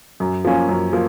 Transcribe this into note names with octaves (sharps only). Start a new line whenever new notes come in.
F#2
F3 A#3 C#4
F#2
F3 A#3